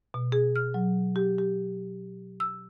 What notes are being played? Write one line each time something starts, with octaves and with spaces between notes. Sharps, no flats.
B2
G#4
F6
F#3
G4
G4
E6